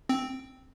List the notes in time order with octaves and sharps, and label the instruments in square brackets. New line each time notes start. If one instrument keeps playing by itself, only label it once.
[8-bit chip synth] C4